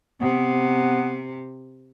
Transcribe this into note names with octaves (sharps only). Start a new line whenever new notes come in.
C3 B3